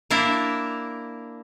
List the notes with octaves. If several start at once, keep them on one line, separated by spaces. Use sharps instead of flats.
A#3 D4 E4 A#4